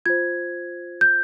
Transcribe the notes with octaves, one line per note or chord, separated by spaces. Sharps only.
F4 C5 G#6
G6